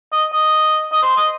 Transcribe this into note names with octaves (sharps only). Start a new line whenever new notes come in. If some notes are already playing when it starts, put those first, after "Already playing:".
D#5
D#5
D#5
C5
D#5